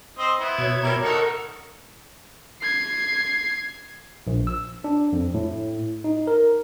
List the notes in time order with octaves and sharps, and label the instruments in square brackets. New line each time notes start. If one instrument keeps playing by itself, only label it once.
[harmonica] C4 C5 D#5
B3 E4
[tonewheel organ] B2 C#5 G#6
[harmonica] G3 E4 A#4
[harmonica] D#4 A4 [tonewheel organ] A#4 F#5 C#6
[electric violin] G#6 C7
[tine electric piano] A#1
E6
D4
F2
A2
D#4
A#4